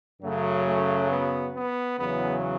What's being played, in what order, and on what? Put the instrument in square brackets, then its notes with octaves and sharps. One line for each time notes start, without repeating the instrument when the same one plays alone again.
[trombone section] F#2 C#3 F#3 A3
A3
B3
B3
E2 C#3 F#3 B3